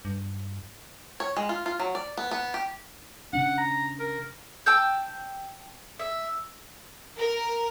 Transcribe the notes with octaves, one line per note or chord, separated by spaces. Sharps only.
G2
C#5
G#3
F4
F4
F#3
D5
B3
B3
G4
C#3 C#4 D4 F#5
A#5
A#4
G5 A5 E6 G6
E5
A#4